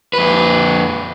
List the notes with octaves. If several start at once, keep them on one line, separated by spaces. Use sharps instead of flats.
F2 B4